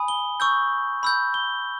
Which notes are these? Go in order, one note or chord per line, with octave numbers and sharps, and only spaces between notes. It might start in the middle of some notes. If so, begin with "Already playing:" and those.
Already playing: G#5 B5 D#6
G7
C#6 E6 G6
B5 E6 G6
G7